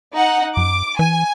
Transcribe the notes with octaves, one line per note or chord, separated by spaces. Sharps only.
D#4 F#5
F#2 D6
E3 G#5